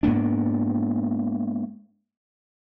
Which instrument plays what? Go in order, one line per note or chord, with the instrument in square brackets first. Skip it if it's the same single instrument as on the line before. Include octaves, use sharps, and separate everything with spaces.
[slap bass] G#2 A#3 B3 D4